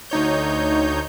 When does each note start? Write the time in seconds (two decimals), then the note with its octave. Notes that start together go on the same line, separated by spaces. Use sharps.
0.10 D2 D#4 C#5 G6